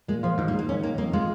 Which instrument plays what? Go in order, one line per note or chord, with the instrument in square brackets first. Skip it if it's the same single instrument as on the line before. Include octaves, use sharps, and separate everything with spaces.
[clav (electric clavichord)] A#2 [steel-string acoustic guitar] G#3
[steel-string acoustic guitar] F3 [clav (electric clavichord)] F4
[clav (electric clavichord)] G#2 [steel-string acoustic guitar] D#3
[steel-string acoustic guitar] A#3
[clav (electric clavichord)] G#2
[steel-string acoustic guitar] A#3
[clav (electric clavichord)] D#3 [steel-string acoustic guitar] C#4
[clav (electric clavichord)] D#3 [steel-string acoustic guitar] A#3
[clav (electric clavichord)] F2 [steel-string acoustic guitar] A#3
[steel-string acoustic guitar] G#3 [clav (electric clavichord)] F4